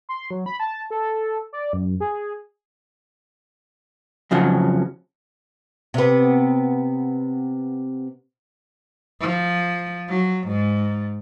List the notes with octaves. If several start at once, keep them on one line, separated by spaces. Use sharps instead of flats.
C6
F#3
B5
A5
A4
D5
F#2
G#4
F2 C#3 F3 F#3
C3 B3
F3
F#3
G#2